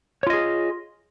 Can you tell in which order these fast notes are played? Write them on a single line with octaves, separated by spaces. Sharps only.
C#5 F4 D#5 G#4